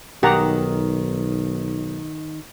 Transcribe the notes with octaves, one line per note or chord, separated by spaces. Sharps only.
B1 D#3 G4 F#5 A#5